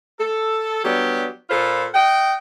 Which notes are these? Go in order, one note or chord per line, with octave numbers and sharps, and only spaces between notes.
A4
F#3 G3 B3 D4 G4
A#2 F4 A4 C5 B5
D#5 F#5 G5